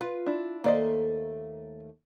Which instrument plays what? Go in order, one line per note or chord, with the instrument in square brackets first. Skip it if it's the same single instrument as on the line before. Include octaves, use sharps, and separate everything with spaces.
[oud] F4 [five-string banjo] B4
[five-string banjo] D4 E4
[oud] D#2 A3 C5 [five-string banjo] A#3 D5 D#5